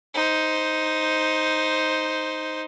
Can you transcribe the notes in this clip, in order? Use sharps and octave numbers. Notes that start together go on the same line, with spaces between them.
D#4 C5